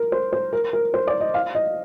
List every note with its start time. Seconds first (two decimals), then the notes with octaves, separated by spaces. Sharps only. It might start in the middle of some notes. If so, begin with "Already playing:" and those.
Already playing: A#4
0.12 C5
0.33 C5
0.53 A#4
0.73 A#4
0.94 C5
1.07 D5
1.21 D#5
1.34 F5
1.55 D#5